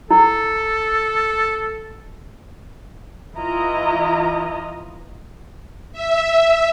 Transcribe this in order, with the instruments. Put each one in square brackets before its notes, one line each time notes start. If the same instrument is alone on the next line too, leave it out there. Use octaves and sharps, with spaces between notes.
[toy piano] E4 [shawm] A4
[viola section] E3 E4 F4 D#5 A#5
[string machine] E5